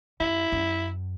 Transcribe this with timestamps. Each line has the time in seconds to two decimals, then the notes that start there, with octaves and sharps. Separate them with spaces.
0.20 F#2 E4
0.52 F#2